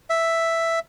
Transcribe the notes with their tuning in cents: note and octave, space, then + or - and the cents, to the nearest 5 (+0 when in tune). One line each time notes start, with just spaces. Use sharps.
E5 +5